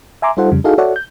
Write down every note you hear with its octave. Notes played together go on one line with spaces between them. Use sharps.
E5 G#5 A#5 C6 D6
G3 D#4 F4 A4 C5 F#5
F2 C#3 G3
D#4 E4 F#4 G#4 A4 F5
F#4 A4 C#5 D5 E5 F#5
G6